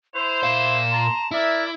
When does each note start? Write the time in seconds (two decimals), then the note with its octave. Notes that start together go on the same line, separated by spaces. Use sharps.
0.15 E4 C5 F7
0.43 A#2 F5 E7
0.91 A5 A#5 C6
1.31 E4 A#4 D5 E5